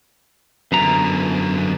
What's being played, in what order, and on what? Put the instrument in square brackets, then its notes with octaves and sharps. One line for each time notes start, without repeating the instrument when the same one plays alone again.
[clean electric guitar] F#2 A#5 [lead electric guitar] D3 B3